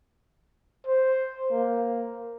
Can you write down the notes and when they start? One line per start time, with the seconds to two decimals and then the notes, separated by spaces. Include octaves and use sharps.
0.87 C5
1.51 A#3